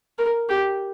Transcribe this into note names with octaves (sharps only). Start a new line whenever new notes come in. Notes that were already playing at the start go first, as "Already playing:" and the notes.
A#4
G4